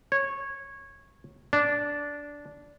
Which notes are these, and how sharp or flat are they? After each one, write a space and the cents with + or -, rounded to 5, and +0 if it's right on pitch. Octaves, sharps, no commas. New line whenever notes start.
C#5 -15
D4 -10